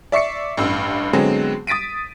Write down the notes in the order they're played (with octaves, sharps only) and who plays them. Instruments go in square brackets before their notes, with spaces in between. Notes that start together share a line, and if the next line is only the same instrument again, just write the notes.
[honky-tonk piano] D5 E5 C#6 C7 C#7
A1 G2 E6
D3 F#3 G#3 B3 C4
D#6 A6 B6 D7 D#7